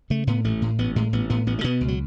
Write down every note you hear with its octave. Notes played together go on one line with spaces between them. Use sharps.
C#3 A3
A2 B3
A1 A3
A2
A1 B3
A2 G#3
A1 B3
A2 B3
A1 B3
A3
B2 B3
C#2
F#3